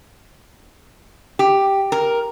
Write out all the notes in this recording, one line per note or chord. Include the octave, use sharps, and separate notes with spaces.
G4
A#4